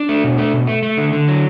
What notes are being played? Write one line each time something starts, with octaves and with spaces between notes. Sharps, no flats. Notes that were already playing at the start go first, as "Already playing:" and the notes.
Already playing: D4
A3
B2
A3
B2
A3
A3
D3
D3
F#3